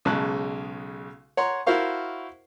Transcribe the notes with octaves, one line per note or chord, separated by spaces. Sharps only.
B1 C#3 G#3 A5 F#6
C#5 F#5 A#5 C6
E4 F#4 A#4 C5 F5 C#6